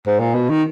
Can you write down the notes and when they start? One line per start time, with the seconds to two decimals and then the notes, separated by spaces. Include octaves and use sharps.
0.06 G#2
0.20 A#2
0.34 B2
0.50 D#3